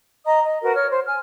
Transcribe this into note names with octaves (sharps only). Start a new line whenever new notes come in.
D#5 A#5 D#6
D#5
F#4 A#4 B4
C#5 F6
C5
G#5 F6